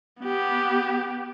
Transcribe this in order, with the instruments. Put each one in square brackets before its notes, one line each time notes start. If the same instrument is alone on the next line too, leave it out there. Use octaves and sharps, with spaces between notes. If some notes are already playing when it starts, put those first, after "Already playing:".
[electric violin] B3 G4